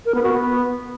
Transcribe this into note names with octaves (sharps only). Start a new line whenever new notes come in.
A#4
B3
F#4
B3